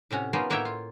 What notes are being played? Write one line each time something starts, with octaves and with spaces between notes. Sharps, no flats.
A2 C3 C#4 F#4
A#3 B3 C#4 D#4 F4 G#4
A2 A#3 F#4 C#5 E5 G5
F4